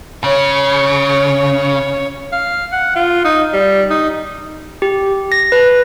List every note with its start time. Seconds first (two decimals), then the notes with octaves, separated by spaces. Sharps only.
0.24 C#3 C#5
2.32 F5
2.72 F#5
2.95 F4
3.25 D#4
3.53 G3
3.90 D#4
4.82 G4
5.32 A#6
5.52 B4